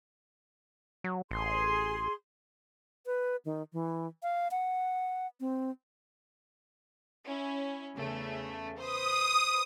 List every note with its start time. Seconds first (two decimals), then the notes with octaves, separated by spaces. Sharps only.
1.04 F#3
1.31 A1 G#4 C6
3.06 B4
3.45 D#3
3.73 E3
4.23 F5
4.51 F#5
5.40 C4
7.25 C#4 E4
7.96 E2 C#3 A3
8.79 B4 C5 D#6